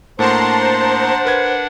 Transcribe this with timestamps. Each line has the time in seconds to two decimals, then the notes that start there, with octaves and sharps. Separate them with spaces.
0.19 A2 A#3 D4 C5 F#5 A5 A#5 C6
1.25 A#4 B4 G#6